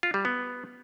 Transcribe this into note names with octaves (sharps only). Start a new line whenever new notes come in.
F4
G3
B3